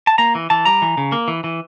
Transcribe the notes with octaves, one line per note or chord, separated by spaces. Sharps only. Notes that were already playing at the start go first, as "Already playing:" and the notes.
A5
A#3 A#5
E3
E3 A5
G3 A#5
E3
C#3
A#3
E3
E3